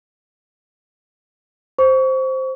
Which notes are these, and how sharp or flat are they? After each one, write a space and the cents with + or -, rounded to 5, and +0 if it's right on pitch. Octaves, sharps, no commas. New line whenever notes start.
C5 +0 C#6 +30